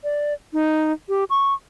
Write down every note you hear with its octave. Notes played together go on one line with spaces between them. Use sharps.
D5
D#4
G4
C#6